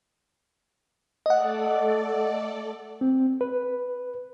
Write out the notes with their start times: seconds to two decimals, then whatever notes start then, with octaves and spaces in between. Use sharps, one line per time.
1.26 A3 A4 D5 D#5 F#5
3.01 C4
3.41 B4